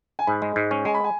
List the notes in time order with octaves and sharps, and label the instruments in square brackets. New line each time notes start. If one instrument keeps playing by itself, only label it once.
[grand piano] G#5
[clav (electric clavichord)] G#2 [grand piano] B5
[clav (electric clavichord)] G#3
G#2
C#4
[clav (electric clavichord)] G#3 [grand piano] G#5
[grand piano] B5
G#5